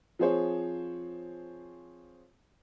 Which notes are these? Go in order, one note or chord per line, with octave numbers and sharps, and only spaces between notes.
F3 C4 G#4 C5 C#5